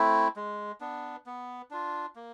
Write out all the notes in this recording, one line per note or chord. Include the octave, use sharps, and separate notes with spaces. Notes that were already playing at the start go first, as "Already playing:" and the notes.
Already playing: A3 C4 E4
G#3
B3 D4
B3
D4 F4
A#3